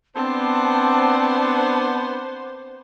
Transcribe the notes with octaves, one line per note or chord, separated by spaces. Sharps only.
B3 C4 D4 C5 A5